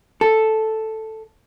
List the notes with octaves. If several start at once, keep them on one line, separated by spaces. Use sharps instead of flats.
A4